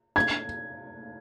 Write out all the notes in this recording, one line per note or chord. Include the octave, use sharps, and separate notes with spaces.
G#6